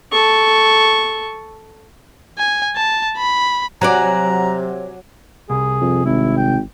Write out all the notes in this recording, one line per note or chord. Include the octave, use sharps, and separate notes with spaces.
A4 C#6
G#5
A5
B5
C3 F#3 D5 F#5 G#5 A#5
C2 G#4
F2
G#1 E4
G5